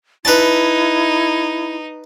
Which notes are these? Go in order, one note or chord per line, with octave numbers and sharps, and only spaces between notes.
D#4 E4 B4 A5